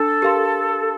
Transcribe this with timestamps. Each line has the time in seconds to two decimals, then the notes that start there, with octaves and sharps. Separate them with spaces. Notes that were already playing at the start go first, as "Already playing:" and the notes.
Already playing: D4 A4
0.22 G4 A#4 F5 C6